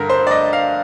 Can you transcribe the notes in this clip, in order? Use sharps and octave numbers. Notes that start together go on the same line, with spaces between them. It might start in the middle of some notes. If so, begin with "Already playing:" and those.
Already playing: G2 D3 A#4
C5
D5
D#5
F5